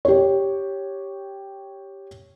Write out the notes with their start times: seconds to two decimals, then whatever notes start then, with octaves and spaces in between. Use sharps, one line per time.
0.05 G4 C#5